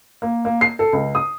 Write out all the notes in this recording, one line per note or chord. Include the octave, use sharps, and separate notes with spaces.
A#3
A#3
C7
A4
C#2
D#6